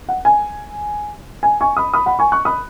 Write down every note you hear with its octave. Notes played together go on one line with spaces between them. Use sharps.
F#5
G#5
G#5
G#5 C#6
B5 D#6
B5 D#6
F#5 B5
G#5 C#6
C#6 F#6
B5 D#6